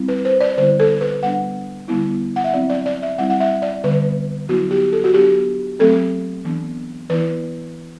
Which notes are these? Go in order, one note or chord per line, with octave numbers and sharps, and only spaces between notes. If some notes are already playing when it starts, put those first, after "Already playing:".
Already playing: G3 C4 E4
B4
C5
D5
D3 G3 B3 E4 C5
A4
B4
G3 B3 D4 F#5
D3 G3 B3 E4
F#5
E5
F#3 C4 E4 D5
D5
D5
E5
G3 C4 E4 F#5
F#5
E5
D5
D3 G3 B3 B4
F#3 B3 E4 F#4
G4
A4
F#4
F#3 B3 D4 G4
F#3 A3 C4 A4
E3 B3 D4
E3 B3 E4 B4